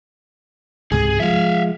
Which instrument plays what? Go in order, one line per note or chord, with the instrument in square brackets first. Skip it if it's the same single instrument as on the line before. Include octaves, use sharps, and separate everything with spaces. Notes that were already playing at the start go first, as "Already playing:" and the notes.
[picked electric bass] C#2 G#2 C3 [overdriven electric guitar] G#4
[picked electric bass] F3 G3 G#3 [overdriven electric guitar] E5 F5